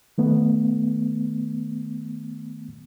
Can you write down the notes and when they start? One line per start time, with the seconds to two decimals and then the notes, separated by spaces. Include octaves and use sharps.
0.18 D#3 A3 B3